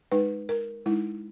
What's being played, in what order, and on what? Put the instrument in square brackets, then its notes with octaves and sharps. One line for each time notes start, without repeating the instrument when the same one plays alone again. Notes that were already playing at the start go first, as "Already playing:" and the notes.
[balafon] G#3 D#4 B4
A#4
G#3 D#4 E4